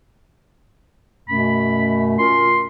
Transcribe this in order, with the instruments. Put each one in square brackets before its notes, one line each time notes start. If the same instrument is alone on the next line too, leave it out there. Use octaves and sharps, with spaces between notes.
[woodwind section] F#2 B2 A3 [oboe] B5
[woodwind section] C#4 F4 A#4 [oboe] C6